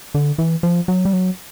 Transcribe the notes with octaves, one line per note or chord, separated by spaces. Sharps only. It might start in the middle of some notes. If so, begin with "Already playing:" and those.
D3
E3
F3
F#3
G3
F#3